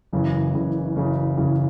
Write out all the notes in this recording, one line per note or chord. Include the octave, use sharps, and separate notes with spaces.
F#1 F#2 C#3 E3
F#1 F#2 C#3 E3
F#1 F#2 C#3 E3
F#1 F#2 C#3 E3